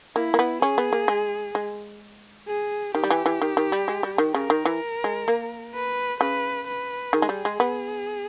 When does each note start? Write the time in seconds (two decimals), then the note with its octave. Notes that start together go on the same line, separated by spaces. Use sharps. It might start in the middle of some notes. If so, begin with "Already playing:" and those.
0.16 A#3 E4
0.34 A#3
0.39 B3
0.62 C#4 G#4
0.78 B3
0.93 A#3
1.08 G#3
1.55 G#3
2.48 G#4
2.95 D#3 G4
3.04 G3
3.10 E3
3.26 E3
3.42 D#3
3.57 D#3
3.72 G3
3.88 G#3
4.03 G3
4.18 D#3
4.34 C#3 A#4
4.50 D#3
4.65 E3
5.04 G#3
5.28 A#3
5.74 B4
6.20 C#3 B4
6.67 B4
7.13 D#3 G#4
7.22 G#3
7.29 G3
7.45 G#3
7.60 B3